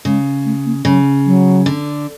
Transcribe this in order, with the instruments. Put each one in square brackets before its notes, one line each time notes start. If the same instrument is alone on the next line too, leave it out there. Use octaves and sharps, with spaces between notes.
[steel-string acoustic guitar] C#3 [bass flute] G#3
[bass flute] A3
A#3
[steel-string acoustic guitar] C#3 [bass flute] F#3
[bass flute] F#3
[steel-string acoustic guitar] D3